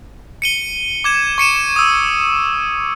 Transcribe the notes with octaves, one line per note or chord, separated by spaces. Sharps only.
C#7 D#7 G7
D6 G#6 E7
C#6 C#7 D#7 E7
D#6 E6